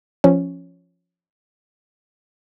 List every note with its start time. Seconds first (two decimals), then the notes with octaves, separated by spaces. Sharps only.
0.24 F3 C#4